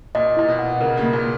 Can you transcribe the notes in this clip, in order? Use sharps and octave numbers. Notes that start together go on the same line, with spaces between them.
A#2 D#5
A#2 E4
B2
F#5
C#3 A#4
C#3
A#3
A#2